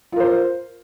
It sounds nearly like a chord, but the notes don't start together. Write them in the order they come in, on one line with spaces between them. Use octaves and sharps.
F4 A#4 C5